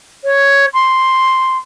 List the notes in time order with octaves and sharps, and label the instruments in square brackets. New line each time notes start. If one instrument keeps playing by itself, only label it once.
[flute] C#5
C6